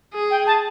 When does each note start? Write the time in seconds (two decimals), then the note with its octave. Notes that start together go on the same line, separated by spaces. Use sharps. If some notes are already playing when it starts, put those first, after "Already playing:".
0.14 G#4
0.30 G5
0.47 A5